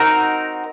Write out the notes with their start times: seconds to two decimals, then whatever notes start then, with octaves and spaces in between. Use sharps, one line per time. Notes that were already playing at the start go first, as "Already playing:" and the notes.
Already playing: C4 D#4 F#4 A#4